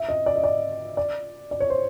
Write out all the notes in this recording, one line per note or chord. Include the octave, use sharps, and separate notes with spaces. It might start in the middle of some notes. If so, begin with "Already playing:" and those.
Already playing: E5
D#5
D5
D#5
D5
D5
D5
C#5
C5